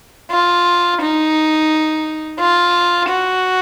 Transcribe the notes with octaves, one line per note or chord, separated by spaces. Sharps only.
F4
D#4
F4
F#4